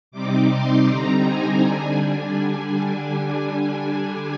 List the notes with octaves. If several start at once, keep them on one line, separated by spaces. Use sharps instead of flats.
C3 G3 C4 D#4 D6
C6
D3 G3 C4 D#4 A#5
G#5
D3 G3 D4
G#5